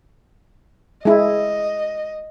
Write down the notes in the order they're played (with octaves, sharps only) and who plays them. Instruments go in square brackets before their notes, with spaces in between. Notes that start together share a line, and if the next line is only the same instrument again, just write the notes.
[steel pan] G#3 E4 [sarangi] D#5